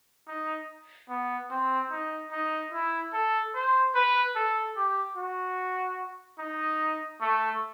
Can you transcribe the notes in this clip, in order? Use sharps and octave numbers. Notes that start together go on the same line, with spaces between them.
D#4
B3
C4
D#4
D#4
E4
A4
C5
B4
A4
G4
F#4
D#4
A3